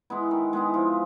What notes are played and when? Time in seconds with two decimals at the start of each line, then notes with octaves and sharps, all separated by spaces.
0.10 G#3 B3 E4
0.31 D#3
0.53 G#3 B3 E4
0.74 F3